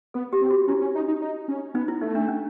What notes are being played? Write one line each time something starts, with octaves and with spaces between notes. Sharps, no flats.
B3 A4
G4
C4
F#4
C#4 E4
C#4
D#4
D#4
D#4
C#4
B3 D#4
E4
A3 D#4
D4
C#4